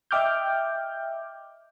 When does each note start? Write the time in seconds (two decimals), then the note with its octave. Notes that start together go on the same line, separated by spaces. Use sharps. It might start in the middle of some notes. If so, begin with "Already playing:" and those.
0.11 D#5 E5 G5 D6 F6 G6